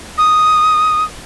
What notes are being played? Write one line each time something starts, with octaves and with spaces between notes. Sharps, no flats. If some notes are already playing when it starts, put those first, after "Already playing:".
D#6